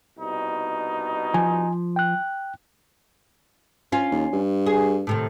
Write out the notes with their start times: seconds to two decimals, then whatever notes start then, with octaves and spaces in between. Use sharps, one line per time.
0.19 C2 B2 D#4
1.34 F3 G#5
1.96 G5 F#6
3.92 C#4 F4
4.11 D#2
4.33 G2
4.66 G#4
5.07 A2 C3 D#3